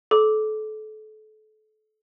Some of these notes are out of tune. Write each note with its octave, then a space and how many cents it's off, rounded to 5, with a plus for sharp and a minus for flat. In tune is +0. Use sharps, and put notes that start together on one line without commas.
A4 -30 D6 +0